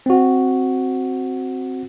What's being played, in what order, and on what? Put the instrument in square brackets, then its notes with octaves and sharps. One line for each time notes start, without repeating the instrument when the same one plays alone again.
[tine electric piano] C4 F#4